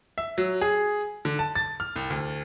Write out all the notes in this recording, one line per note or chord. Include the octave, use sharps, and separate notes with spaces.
E5
F#3
G#4
D3
A5
A6
F6
C2
D2